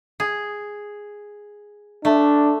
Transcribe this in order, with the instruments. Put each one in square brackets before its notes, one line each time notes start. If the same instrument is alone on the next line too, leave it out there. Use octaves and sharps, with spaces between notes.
[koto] G#4
[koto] A3 [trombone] D4